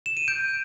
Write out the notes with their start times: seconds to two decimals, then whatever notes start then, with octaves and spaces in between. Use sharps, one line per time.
0.06 E7
0.17 D#7
0.28 G6 D7